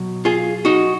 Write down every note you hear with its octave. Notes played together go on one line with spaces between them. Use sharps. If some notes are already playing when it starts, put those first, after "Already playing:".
Already playing: B2 F#3
F4 G#4
D#4 F#4